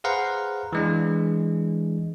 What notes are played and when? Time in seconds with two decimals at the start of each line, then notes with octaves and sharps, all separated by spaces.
0.04 G#4 B4 C5 F5 F#5 A#5
0.73 E3 G#3 D4